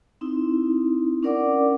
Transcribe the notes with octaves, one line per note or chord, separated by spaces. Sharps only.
C4 D#4 E4
C#4 D4 A#4 D5 F#5 D6